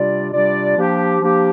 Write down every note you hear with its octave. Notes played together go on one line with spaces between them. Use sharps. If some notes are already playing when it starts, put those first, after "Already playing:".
Already playing: C3 G3 D4 F4 D5
C3 G3 D4 F4 D5
F3 A#3 D4 G4
F3 A#3 D4 G4